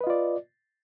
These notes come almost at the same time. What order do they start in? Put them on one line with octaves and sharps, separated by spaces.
B4 D#5 F4 D5